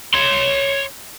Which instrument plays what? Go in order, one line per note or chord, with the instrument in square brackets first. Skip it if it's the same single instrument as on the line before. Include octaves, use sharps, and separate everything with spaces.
[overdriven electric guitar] C#5 C6